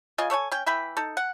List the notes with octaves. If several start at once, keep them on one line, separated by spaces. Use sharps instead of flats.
C#3 F4 D#5 G#5
A4 C#5 F#5 G#5
C#4 G5
E3 E5 G5 B5
D#4 A4
F#5